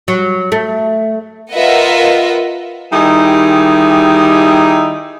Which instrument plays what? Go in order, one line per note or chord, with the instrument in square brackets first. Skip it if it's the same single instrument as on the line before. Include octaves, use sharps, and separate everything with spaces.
[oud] F#3
A3
[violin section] F4 A#4 B4 D#5 E5 F#5
[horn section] D#3 G3 D#4 E4 G4 G#4